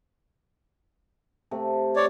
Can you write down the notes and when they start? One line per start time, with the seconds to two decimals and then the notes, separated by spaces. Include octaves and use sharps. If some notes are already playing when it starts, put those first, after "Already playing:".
1.51 C3 A3
1.96 C#5 D5